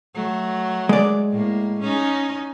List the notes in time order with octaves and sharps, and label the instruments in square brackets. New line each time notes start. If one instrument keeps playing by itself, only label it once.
[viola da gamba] F#3 A3
[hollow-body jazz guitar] G#3 D5
[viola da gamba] A2 A#3
C#4 D#4